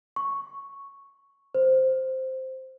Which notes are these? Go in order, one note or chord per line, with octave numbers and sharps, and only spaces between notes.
C#6
C5